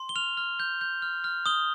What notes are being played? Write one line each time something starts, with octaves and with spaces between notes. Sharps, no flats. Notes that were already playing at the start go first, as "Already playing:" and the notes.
Already playing: C6
G7
F6 F7
F6
G6
G6
F6
F6
D#6 G7